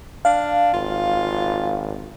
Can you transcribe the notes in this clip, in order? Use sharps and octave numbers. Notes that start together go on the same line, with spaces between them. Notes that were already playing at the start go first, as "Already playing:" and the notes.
D4 F5
G#1 F4